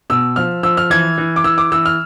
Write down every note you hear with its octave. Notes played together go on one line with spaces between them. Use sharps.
B2 E6
F3 F6
F3 E6
F6
E3 G#6
E3
D6
E3 E6
D6
E3 E6
F6